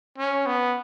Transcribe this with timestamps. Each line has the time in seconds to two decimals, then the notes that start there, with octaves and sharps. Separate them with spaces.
0.18 C#4
0.46 B3